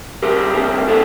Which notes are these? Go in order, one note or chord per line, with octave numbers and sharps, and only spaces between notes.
C2 C3 G3 G4 A#4
D2 C3 G3 A#3
A#3 A4 C5